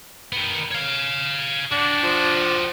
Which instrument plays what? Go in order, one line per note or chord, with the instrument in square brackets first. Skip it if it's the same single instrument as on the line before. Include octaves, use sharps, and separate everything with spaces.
[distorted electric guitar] D#3 B3
C#5 F5
[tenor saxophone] D4 [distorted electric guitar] F#4 G4
[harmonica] F3